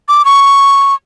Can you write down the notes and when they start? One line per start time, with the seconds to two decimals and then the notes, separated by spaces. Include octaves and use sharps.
0.08 D6
0.25 C#6